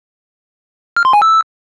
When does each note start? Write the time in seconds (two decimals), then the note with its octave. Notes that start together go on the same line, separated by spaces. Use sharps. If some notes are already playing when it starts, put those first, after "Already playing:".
0.97 F6
1.05 C6
1.13 G#5
1.22 E6